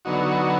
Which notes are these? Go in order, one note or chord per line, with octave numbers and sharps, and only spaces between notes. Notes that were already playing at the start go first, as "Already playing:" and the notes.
D3 F#3 B3 D#4 F#4